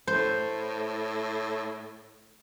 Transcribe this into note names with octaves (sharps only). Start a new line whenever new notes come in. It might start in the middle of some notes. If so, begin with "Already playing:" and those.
A2 C5